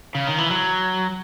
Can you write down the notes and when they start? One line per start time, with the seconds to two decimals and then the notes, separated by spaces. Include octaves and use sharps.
0.15 C#3
0.27 D#3
0.38 E3
0.51 F#3